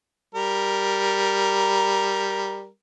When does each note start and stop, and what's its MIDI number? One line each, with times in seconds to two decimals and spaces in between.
0.35 2.68 55
0.35 2.68 70